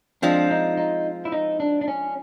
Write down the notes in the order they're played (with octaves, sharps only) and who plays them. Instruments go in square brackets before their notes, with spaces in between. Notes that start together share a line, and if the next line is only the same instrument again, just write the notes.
[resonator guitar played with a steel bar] F3 G#3 C4 F4 [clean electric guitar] D4
[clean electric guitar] D#4
D#4
E4
D#4
D4
D4
C#4